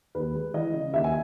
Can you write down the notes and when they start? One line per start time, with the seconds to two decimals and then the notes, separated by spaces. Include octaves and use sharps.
0.15 D#2 B4
0.35 G#3
0.54 E3 D#5
0.73 C#3
0.93 D#2 E5
1.04 G#5